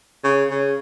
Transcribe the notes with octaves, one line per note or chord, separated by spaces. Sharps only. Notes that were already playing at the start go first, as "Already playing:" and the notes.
C#3
C#3